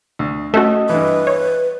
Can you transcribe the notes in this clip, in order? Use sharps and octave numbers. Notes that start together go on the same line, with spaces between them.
D2
A3 C#4 F#4 A4 D#5
G2 E3 B4
C#5